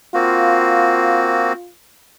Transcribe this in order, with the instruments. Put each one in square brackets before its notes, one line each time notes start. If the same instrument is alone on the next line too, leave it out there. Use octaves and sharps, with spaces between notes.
[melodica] A#3 C4 F#4 [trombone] F4